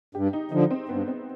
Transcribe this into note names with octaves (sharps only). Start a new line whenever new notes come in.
G2 G4
D#4
D3 F3 D#4
C4
G2 B3
C4